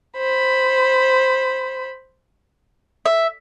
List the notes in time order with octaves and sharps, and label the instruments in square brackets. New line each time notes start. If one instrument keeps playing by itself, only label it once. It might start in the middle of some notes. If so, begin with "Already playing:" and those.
[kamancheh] C5 B5
[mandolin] E5